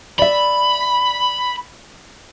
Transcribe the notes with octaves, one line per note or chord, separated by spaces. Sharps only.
D5 E5 B5